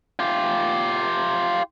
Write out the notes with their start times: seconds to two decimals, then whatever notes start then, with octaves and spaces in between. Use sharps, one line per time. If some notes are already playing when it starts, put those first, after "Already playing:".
0.19 F4 G4